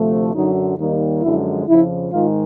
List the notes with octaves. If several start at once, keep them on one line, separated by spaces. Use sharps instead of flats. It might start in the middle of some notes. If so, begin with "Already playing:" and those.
Already playing: D2 C3 F3 A3
F#2 D3 F#3 D#4
D#2 D#3 G3 A#3 D#4
F#2 D3 F3 G#3 E4
F2 C#3 F3 E4
G#2 D#3 G#3 F4